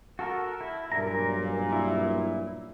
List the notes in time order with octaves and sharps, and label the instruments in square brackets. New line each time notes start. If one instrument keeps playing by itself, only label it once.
[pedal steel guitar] F#4 A4 A#4
E4
[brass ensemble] B1 G2 A#2 [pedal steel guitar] A#4 A#5
[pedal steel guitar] E4